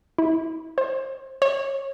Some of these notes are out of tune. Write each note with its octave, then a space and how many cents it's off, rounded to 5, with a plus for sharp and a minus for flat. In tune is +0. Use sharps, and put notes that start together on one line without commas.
E4 -30
C5 +25
C#5 -25